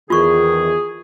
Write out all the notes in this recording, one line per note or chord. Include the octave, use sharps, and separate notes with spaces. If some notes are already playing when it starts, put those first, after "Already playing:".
E2 D#3 F4 G#4 C#6